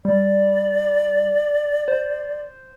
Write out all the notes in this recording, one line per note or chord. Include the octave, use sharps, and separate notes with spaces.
G3 D5
C5